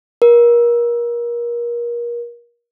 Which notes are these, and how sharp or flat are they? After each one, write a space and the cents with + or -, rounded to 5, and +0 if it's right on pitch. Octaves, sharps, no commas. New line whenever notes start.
A#4 +30